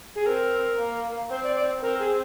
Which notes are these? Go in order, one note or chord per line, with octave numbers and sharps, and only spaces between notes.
G#4
C4 A#4
A#3
C4 C5
D5
D5
C4 A#4
G#4